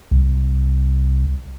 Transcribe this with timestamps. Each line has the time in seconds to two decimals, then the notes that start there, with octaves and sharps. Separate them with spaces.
0.11 C2